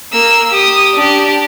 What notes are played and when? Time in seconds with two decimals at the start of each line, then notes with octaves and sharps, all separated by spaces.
0.12 A#3 E6
0.51 G4 D#6
0.95 D4 G4